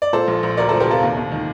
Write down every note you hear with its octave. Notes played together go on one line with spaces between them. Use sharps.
D5
A#2 A4 C5
A#1
A#1
D2 A#4 D5
F3 A4 C5
G4 A#4
C3 F4 A4
D#2
D#2
D#3